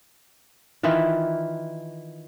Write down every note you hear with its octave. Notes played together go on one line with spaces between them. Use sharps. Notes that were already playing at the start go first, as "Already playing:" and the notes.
D#3 E3 E4 F4